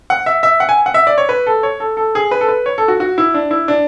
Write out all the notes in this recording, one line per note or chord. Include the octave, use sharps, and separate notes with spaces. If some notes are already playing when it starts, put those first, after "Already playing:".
F#5
E5
E5
F#5
G#5
F#5
E5
D5
C#5
B4
A4
C#5
A4
A4
G#4
B4
A4
B4
C#5
A4
F#4
F#4
E4
D4
E4
D4